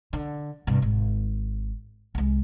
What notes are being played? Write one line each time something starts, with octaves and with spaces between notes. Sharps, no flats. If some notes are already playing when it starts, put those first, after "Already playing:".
D3
G2 C3
G#1
C2 G#3